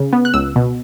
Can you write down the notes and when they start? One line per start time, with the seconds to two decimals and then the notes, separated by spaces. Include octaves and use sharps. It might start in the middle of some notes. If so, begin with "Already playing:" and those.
Already playing: C#3
0.13 B3
0.25 F#6
0.34 C#2 E6
0.56 B2